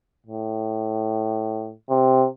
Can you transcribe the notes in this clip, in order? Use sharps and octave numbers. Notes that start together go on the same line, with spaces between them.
A2
C3